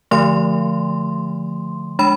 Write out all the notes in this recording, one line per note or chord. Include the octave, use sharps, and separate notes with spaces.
D3 F3 A3 C6
G#3 D4 B5